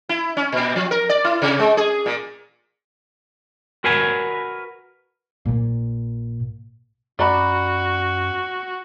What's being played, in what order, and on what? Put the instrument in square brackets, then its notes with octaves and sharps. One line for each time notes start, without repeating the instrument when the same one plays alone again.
[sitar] E4
C#4
A#2
F3
A#4
D5
E4
C3
G#3
G#4
A#2
[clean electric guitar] F#4 A#4 B4 G#5
[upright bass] A#1 A#2
[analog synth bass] F#2 [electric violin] F#4 [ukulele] D5 A#5 B5